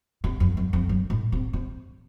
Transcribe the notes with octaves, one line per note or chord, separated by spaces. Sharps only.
C3
F2
F#2
F2
F#2
A2
C3
C3